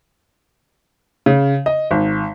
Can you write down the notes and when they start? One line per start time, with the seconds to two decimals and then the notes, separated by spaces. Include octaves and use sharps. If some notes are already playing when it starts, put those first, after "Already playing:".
1.26 C#3
1.66 D#5
1.91 G#1